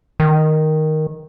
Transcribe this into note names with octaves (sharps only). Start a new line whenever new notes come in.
D#3